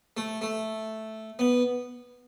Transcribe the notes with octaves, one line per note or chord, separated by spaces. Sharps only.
A3
A3
B3